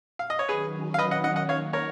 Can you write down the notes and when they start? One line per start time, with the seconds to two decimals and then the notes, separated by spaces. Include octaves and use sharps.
0.19 F5
0.30 D#5
0.39 C#5
0.49 D#3 F#3 C#4 G#4 B4
0.94 F5
0.98 B4 D#5
1.11 D#5 F#5
1.24 D#5 F#5
1.36 D#5 F#5
1.49 A#3 D#4 F#4 C#5 F5
1.73 A#4 C#5